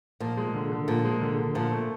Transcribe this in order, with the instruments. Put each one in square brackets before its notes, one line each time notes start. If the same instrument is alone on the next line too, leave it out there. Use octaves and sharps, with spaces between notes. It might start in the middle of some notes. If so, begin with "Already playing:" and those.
[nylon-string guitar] A#2 [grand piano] F3
[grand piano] G#3
D3
D3
[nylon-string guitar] A#2 [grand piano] F3
[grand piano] G#3
D3
D3
[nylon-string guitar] A#2 [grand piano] F3
[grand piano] A3